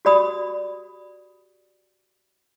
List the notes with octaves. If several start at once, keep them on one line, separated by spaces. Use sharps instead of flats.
F#4 G4 D5 B5 D#6